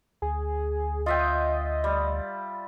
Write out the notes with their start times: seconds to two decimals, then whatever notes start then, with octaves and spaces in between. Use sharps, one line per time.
0.22 D2 G#4
1.06 F4 D#5 E5 G5
1.84 G3